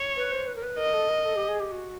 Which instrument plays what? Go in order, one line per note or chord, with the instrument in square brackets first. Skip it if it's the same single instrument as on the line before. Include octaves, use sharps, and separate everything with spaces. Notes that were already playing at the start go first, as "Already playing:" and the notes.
Already playing: [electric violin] C#5
[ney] B4
C5
B4
A#4
B4
[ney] A#4 [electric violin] D#5
[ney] A4
A#4
A4
G4
G#4
G4
F#4